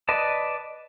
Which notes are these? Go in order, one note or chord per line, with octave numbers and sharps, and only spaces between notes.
B4 D5 D#5 A5